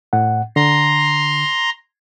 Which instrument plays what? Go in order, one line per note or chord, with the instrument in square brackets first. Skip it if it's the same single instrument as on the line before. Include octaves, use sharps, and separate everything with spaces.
[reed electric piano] A2 F#5
[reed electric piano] D3 [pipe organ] A#5 C6